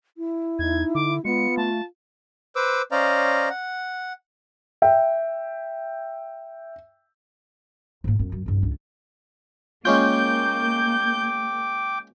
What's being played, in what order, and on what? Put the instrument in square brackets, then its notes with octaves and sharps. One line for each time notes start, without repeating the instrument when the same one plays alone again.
[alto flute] E4
[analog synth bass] E2 [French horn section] D#4 [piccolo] G#6
[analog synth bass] D3 [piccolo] D6
[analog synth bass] G#3 [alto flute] B3 [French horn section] F4 [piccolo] C#7
[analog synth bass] A3 [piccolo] A5
[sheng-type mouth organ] B4 C5 D6 E6
C#4 C5 D5 D#5 F5 A#5
F#5
[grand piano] E5 G5
[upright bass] G#2 A#3
F#2 B3
F#2
C2 G2
C#2 D4
[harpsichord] G#3 C#4 F4 [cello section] A#3 [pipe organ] G5 D6 [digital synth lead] G6